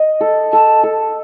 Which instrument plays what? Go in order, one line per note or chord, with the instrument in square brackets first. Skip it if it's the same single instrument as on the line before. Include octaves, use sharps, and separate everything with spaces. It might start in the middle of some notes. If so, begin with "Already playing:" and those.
Already playing: [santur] D#5
A4
[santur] A4 [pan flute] A5
[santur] A4